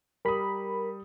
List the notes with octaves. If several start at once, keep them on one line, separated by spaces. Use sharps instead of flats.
G3 A#4 B5 D#6